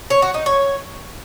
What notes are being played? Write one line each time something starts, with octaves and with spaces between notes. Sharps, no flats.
C#5
F#4
D#4
C#5